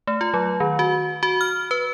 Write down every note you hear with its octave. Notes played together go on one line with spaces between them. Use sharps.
A3
F4
F#3
D#3
F#4
F#4
F6
B4